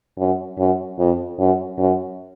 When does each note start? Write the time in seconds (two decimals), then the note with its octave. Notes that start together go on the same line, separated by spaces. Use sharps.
0.18 F#2
0.58 F#2
0.98 F2
1.39 F#2
1.79 F#2